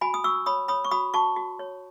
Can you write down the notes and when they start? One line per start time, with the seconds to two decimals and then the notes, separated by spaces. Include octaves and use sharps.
0.01 F#4 G#5 B5
0.14 D#6
0.24 F#4 C#6 E6
0.46 C#5 B5 D#6
0.68 C#5 B5 D#6
0.85 C#6
0.91 F#4 B5 D#6
1.14 F#4 A5 C#6
1.36 F#4
1.59 C#5